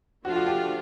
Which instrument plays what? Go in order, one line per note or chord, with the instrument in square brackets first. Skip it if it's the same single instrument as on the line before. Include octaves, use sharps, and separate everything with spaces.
[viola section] F3 A3 D4 F4 [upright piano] F#4
[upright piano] F#4
G4